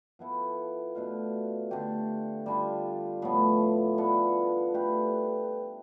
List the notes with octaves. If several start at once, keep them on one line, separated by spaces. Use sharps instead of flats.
F3 B3 E4 A4
B2 A3 D4 F4
D3 A3 D4 G4
G3 D4 F4
A2 F3 B3
F3 B3 D4 A4
A3 D4 G4 B4